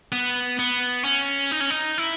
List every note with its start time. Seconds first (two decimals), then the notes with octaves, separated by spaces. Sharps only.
0.12 B3
0.59 B3
1.04 C#4
1.51 D#4
1.60 C#4
1.70 D#4
1.98 E4